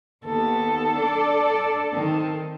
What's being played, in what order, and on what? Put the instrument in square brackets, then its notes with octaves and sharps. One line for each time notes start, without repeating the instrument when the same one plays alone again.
[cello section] D#2 B3 [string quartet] A4
[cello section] D4 D5
D#3 C4